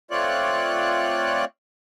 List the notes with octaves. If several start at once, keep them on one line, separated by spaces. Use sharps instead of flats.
A3 C4 F4 C#5 D5 F#6